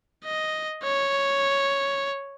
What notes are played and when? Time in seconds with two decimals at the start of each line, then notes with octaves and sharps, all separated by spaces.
0.25 D#5
0.84 C#5